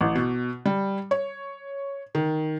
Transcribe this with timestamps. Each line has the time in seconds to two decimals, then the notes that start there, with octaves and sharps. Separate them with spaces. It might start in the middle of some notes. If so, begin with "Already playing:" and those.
0.01 A1
0.15 B2
0.66 G3
1.11 C#5
2.15 D#3